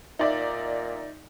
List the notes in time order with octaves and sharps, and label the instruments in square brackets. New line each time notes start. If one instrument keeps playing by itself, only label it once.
[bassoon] A#2 [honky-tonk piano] D#4 D5 E5